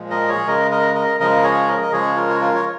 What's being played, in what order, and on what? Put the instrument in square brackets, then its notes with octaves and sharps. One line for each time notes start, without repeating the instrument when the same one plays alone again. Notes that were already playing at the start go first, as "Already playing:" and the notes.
Already playing: [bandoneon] A#2 F3 G#3
A#4 D#5
G#4 C#5
C#3 G#3 A#4 D#5
A#4 D#5
A#4 D#5
C#3 F3 G#3 A#4 D#5
G#4 C#5
A#4 D#5
D#5
C#3 F3 G#3 G#4 C#5
F4 A#4
C#5
F4 A#4
C#5